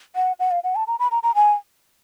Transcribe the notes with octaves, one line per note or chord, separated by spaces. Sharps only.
F#5
F#5
F5
F#5
A5
A#5
B5
A#5
A#5
G#5